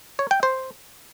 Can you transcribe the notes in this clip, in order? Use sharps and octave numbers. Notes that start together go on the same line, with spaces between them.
C#5
G5
C5